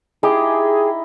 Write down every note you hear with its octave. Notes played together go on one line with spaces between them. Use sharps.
D#4 E4 G4 G#4 D#5